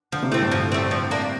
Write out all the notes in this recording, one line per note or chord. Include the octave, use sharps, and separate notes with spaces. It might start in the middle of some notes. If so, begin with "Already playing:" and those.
D3 F3
C3
A2 A3 C4
G2
F3
A3 C4
F3
A#3 D4